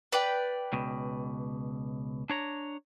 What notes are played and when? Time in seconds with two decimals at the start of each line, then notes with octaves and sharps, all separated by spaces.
0.12 B4 D5 G5
0.73 C#2 B2
2.30 D4 C#5 A#5